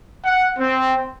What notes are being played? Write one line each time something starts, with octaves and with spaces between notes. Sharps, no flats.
F#5
C4